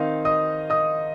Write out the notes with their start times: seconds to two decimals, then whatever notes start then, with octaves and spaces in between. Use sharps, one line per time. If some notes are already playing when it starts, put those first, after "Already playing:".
Already playing: D#3 C4 D#4 F5
0.25 D#5 D#6
0.70 D#5 D#6